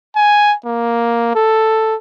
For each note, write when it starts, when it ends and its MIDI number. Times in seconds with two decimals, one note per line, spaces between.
0.16 0.54 80
0.65 1.35 58
1.36 1.95 69